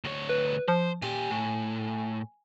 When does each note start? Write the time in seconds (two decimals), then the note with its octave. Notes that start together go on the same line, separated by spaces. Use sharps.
0.04 D2 C#5
0.29 B4
0.68 F3 C5
1.02 A#2 G4 G#5
1.30 A2